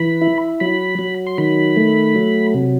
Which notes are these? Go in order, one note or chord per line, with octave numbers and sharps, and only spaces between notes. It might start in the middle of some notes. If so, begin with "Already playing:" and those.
Already playing: E3 B5
E4
F#3 B5
F#3
C6
D#3 B5
A3
F#3
C3